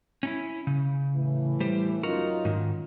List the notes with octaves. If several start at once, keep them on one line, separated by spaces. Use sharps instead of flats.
C#4 D#4 E4
C#3
A2 E3
G3 G4 C5
F#2 D#4 F4 F#4 A#4
G#2 D#3